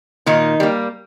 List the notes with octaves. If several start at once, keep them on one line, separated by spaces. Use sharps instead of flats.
A#2 D#3 D#4
G3 A#3